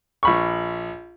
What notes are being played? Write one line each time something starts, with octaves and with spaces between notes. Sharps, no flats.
A#1 B5 C#6